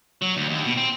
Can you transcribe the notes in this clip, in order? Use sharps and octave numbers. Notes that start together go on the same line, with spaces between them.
F#3
D2
D#2
B2
C4